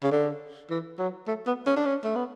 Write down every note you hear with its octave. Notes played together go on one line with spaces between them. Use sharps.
C#3
D3
E3
F#3
A3
B3
C#4
D4
C#4
A3
B3